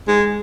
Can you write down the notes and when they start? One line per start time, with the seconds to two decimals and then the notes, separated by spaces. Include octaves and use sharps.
0.08 G#3